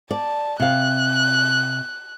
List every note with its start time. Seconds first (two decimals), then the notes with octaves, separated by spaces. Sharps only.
0.11 D5 A5
0.60 C3 F5 F#6